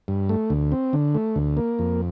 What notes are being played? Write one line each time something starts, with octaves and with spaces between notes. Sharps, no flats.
G2
A3
D2
C4
D3
A3
D2
A#3
F2